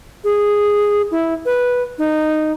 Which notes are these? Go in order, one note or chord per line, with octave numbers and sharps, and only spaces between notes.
G#4
E4
B4
D#4